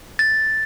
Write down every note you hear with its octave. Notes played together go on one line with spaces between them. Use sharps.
A6